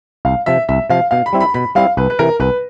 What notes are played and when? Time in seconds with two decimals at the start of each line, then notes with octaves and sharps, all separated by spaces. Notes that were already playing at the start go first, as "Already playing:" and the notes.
0.25 C2 F5
0.46 C3 F3 E5
0.69 C2 E5
0.90 C3 F3 F5
1.11 B2 F5
1.26 B5
1.33 G3 C4 E4
1.40 B5
1.54 B2 B5
1.75 G3 C4 E4 F5
1.97 C2 B4
2.10 B4
2.19 C3 E3 A#4
2.40 C2 B4